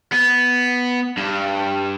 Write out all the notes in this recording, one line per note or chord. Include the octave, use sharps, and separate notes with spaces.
B3
G2